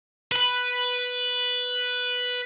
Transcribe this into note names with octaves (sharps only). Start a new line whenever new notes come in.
B4 B5